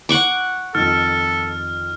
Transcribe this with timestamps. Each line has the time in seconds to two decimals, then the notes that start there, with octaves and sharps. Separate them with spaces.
0.09 F#5 C#6 D6
0.75 F2 D#3 A4 F6